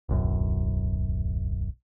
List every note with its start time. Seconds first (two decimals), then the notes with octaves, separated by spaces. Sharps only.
0.09 D1 B1 F#2